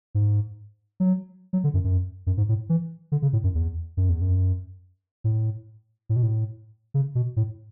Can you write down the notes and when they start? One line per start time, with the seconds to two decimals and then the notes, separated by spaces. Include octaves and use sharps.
0.15 G#2
1.00 F#3
1.53 F#3
1.64 D3
1.74 F#2
1.84 F#2
2.27 F#2
2.37 G#2
2.49 A2
2.69 E3
3.12 D3
3.22 C#3
3.33 A2
3.44 F#2
3.55 E2
3.97 F#2
4.09 E2
4.21 F#2
5.24 A2
6.09 A2
6.16 B2
6.23 A2
6.94 C#3
7.15 B2
7.36 A2